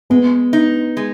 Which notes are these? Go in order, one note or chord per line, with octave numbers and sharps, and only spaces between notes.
G#3 B3
D#4
G#3